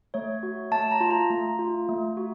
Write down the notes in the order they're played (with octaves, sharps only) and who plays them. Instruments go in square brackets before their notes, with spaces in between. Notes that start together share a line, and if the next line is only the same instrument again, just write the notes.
[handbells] A3 C#5
F#4
A3 A5
A#5
F4
A#5
A3
F4
A3
F#4